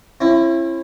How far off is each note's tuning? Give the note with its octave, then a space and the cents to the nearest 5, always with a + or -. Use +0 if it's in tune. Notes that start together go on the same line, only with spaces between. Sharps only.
C#4 -40 E4 +30